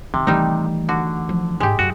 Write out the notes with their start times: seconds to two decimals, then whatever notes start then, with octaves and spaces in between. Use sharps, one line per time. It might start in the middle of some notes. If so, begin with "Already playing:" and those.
0.14 C3 D#3
0.27 E3 G3 A3 D#4
0.89 D3 F#4
1.29 F3
1.60 G#2 G#3 G4
1.79 F#2 F#4